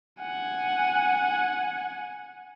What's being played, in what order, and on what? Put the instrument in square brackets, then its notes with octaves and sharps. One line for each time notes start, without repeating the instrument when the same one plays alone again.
[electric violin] F#5 G#5